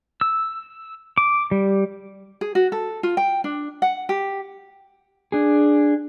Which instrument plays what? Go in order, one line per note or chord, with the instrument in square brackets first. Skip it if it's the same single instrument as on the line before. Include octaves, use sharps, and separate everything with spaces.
[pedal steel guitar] E6
D6
G3
[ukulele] G#4
F#4
A4
F4
G5
D4
F#5
G4
[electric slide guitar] D4 G#4